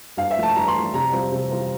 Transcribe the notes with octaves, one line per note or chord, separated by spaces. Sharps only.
G2 F5
E5
F3 A3
A5
G2 A#5
C6
F3 A3
C3 A#5
G3 C4 F4
C3
G3 C4 F4